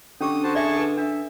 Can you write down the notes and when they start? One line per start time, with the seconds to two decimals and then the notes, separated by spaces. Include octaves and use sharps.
0.21 D3 C#4 G4 D6 D#6
0.43 F#4 C5 A5
0.55 G#4 D5 E5 A5 C#6
0.77 A4 B4
0.98 D4 E5